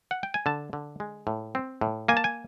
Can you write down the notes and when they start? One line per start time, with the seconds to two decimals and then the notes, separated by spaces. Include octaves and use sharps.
0.11 F#5
0.23 G5
0.34 G#5
0.46 D3 A5
0.73 D3
1.00 G#3
1.27 A2
1.55 C4
1.81 A2
2.08 A#3 G#5
2.17 A5
2.24 G#5